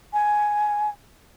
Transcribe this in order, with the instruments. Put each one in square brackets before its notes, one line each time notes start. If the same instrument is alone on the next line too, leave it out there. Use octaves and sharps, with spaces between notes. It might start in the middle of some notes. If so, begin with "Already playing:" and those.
[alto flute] G#5